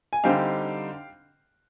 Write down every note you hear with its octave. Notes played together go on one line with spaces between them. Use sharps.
G#5
D3 G3 C4 D#4 F5 G5